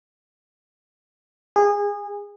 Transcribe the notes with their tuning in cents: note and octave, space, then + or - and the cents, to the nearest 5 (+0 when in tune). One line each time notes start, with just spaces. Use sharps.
G#4 -25